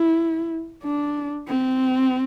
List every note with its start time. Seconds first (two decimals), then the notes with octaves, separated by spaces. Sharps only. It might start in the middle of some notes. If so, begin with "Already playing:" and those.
Already playing: E4
0.83 D4
1.48 C4